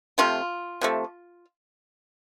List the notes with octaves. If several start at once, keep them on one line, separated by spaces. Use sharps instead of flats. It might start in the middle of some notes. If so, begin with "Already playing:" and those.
C3 F3 A3 F4
C3 F3 A3